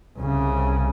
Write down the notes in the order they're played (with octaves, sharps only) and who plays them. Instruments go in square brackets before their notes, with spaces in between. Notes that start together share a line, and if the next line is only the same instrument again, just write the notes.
[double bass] C2 C#3